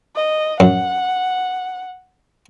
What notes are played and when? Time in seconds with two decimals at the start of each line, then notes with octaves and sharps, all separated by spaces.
0.16 D#5
0.60 F#2 F#5